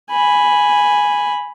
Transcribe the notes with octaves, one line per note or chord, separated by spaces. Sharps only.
G#5 B5